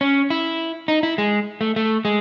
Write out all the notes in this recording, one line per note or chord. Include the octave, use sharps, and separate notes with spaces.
C#4
E4
D#4
E4
G#3
A3
A3
G#3